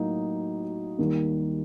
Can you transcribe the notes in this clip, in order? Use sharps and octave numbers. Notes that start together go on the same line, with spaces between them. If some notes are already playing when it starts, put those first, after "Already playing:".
Already playing: A2 F#3 A#3 D#4
D#2 D#3 G3